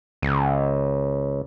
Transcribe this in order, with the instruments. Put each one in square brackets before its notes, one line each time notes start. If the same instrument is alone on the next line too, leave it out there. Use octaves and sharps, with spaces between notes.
[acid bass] C#2